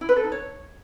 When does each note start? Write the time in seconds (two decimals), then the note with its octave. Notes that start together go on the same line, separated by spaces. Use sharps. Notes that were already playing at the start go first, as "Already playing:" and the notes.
0.01 E4
0.09 B4
0.16 A4
0.24 D#4
0.32 C#5